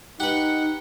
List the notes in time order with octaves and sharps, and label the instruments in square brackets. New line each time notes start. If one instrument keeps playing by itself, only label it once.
[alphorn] D#4 [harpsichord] G4 B4 [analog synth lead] F#5